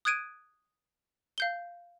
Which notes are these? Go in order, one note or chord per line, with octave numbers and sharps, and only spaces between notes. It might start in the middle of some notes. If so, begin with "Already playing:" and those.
D#6 F#6 G#6 D7 D#7
F5 G6 G7